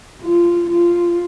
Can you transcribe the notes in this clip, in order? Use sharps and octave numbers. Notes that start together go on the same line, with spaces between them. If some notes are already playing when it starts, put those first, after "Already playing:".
F4
F4